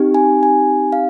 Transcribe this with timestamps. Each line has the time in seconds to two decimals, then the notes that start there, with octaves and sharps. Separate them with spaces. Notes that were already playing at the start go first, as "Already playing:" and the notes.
Already playing: C4 D#4 G4
0.14 G#5
0.43 G#5
0.92 F5